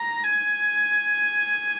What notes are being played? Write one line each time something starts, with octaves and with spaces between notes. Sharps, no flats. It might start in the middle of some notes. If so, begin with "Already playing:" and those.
Already playing: A#5
G#5